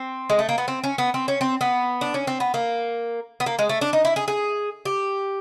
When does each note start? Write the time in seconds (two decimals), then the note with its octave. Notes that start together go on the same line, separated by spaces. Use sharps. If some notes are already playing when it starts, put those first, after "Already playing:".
Already playing: C4
0.30 G#3
0.39 A3
0.49 A#3
0.58 B3
0.68 C4
0.84 C#4
0.98 B3
1.14 C4
1.28 C#4
1.41 C4
1.61 B3
2.01 D4
2.14 C#4
2.27 C4
2.40 B3
2.54 A#3
3.40 B3
3.46 A#3
3.59 G#3
3.69 A3
3.81 D4
3.93 D#4
4.05 E4
4.16 G#4
4.28 G#4
4.85 G4